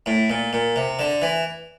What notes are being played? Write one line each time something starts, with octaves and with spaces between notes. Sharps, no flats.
A2
A#2
A#2
C3
D3
E3